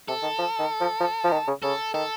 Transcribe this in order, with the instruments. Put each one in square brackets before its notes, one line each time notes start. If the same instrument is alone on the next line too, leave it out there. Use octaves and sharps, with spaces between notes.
[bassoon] C3 [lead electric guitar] A4
[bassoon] D#3
F3
D#3
F3
F3
F3
D#3
C#3
[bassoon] C#3 [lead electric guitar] A4
[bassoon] D#3 [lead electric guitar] A4